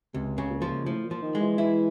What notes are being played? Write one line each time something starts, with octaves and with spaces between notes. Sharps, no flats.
C#2 C3
C#3
A#2
F3
A2 F3
A#2
F3
D#3
G#3
E3
E3 E4